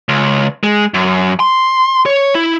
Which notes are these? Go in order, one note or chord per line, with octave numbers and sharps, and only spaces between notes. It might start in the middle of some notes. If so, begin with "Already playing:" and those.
C#2
G#3
F#2
C6
C#5
E4